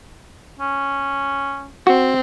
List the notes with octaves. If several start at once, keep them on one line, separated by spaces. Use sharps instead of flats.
C#4
C4 F#4